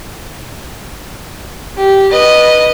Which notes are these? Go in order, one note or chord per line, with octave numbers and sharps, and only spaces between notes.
G4
B4 D#5